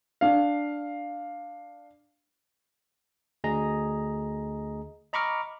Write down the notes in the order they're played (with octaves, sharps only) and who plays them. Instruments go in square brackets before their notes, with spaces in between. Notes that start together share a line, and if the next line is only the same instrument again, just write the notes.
[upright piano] D4 F5
[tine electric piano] D2 G#4 D#5 A#5
D#5 A#5 B5 C#6 D6 F6